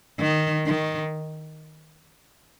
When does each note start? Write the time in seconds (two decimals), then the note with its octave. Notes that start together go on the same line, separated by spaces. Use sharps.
0.20 D#3
0.66 D#3